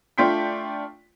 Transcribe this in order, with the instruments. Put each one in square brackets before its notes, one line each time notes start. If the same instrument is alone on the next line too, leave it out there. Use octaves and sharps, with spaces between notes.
[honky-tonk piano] A3 D4 F4 G5 C6 B6